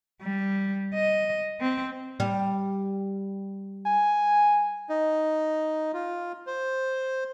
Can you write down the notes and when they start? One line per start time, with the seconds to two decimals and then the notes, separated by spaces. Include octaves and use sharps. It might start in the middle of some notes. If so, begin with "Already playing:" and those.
0.22 G3
0.95 D#5
1.61 C4
2.20 G3
3.86 G#5
4.89 D#4
5.93 F4
6.47 C5